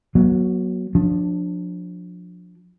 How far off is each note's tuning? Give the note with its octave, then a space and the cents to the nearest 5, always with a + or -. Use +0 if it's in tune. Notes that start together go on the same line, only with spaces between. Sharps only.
F#3 +0 B3 -45
F3 +30 D4 +0